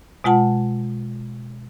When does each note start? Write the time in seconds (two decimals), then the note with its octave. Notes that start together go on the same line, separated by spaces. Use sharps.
0.24 B2 G#3 F4 F#5 A5